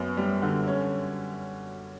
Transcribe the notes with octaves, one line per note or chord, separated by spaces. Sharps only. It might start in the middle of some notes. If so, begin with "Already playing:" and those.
Already playing: F#2 B3
G3
D3
C#4